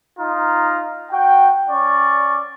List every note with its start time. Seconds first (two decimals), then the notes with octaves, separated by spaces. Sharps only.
0.19 D#4 F4 A#5
1.11 F#4 G5
1.69 C#4 D5 C#6